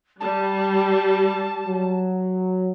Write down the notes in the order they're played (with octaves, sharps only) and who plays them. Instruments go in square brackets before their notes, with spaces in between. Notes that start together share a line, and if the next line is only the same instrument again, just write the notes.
[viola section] G3 [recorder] A5
[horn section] F#3